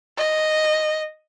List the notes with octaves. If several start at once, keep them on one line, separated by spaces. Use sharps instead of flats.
D#5